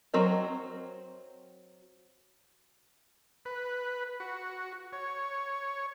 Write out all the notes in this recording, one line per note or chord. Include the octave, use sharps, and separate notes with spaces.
F#3 C4 A#4 D#5
B4
F#4
C#5